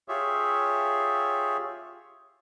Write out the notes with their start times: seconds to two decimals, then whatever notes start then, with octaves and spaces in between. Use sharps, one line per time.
0.08 F4 G4 G#4 C#5 E5